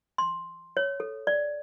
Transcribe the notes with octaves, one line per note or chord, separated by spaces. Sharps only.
C6
C#5
A4
D5